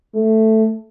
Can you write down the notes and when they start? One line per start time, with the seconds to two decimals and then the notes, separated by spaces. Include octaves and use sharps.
0.14 A3